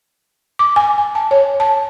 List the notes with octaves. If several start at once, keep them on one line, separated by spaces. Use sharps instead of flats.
D6
G#5
G#5
A5
C#5
A5